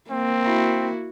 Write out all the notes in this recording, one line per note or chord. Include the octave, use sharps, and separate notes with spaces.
A#3 C4
E4 F#4